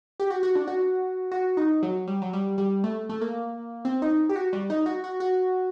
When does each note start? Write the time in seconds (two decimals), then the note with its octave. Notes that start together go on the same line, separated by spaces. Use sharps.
0.20 G4
0.30 F#4
0.43 F#4
0.55 D4
0.67 F#4
1.32 F#4
1.57 D#4
1.83 F#3
2.08 G3
2.22 F#3
2.33 G3
2.58 G3
2.84 A3
3.09 A3
3.21 A#3
3.85 C4
4.02 D#4
4.29 G4
4.36 F#4
4.53 G3
4.70 D#4
4.86 F#4
5.04 F#4
5.20 F#4